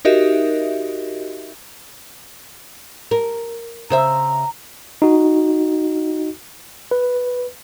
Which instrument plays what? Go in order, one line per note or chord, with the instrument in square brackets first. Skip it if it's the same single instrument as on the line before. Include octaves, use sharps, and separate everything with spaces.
[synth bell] D#4 F#4 G4 A#4 D#5 E5
[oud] A#4
[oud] C#3 C5 E5 [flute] A#5
[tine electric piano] D#4 F#4
B4